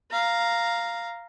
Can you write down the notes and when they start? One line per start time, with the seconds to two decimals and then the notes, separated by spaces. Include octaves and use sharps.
0.12 F5 A#5